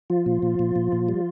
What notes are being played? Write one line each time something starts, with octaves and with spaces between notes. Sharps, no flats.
F3 F4
A#2
A#2
A#2
A#2
A#2
G3